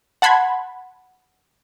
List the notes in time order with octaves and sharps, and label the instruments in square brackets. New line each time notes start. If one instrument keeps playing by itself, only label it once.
[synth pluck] F#5 A5 B5 C6 G#6